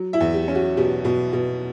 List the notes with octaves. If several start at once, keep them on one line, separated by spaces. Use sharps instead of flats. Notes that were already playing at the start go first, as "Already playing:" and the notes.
Already playing: F#3
E4 E5
E2
G4
C#4
F#4
B2 G4
B2
B2